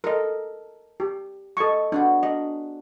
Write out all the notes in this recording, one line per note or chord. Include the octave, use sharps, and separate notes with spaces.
A4 A#4 D#5
G4
A4 D#5 G#5 C#6
B3 D4 F#4 G#4
D4 D#5